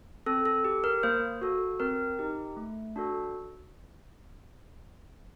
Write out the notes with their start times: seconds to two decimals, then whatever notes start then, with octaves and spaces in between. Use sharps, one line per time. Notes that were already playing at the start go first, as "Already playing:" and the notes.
0.26 C4 A4
0.45 A4
0.65 G4
0.84 A#4
1.03 A#3 C5
1.41 F#4 A4
1.80 C4 A#4
2.19 D#4 G4
2.57 A3
2.96 D4 F#4 A4